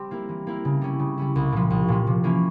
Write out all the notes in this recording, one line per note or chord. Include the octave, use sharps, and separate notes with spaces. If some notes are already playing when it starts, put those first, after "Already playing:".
Already playing: G3 C4 G4
A#3 E4 A#4
E3
A#3 E4 A#4
C#3
G3 C#4 E4
C#3
G3 C#4 E4
C2
A#2 F3
C2
A#2 F3
C3
E3 A#3 C#4